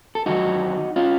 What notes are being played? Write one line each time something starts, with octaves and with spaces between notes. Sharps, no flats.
A4
F2 D#3 F#3 D#4 F#4
C#4 F4